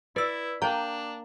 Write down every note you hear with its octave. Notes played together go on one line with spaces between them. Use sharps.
E4 B4 D5 E6
A#3 D4 G5 A#5